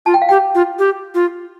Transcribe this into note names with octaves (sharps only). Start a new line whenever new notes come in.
F4 A5
G5
F5
G4 G5
F4
G4
F4